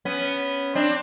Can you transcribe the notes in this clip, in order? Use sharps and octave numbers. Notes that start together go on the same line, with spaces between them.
B3 C#4
C4 D4